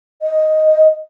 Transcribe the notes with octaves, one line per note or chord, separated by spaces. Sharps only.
D#5